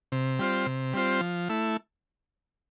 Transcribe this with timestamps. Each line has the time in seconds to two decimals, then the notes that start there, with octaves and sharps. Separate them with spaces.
0.12 C3
0.39 G3 C4 F4 C5
0.66 C3
0.93 G3 C4 F4 C5
1.21 F3
1.49 A3 E4